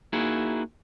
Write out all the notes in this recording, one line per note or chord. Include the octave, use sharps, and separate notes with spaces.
A#3 D#4 E4 F#4 G#4